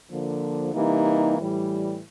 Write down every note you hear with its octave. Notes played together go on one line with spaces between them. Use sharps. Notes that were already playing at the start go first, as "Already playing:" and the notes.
D3 F3 A#3
C3 E3 G3 A#3 D#4
A2 E3 G3